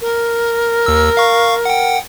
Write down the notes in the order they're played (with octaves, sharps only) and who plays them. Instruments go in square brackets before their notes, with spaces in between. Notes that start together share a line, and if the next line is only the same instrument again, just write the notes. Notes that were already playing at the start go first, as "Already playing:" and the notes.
[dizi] A#4
[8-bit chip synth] D#2 E6
F5 C#6
F#5 G5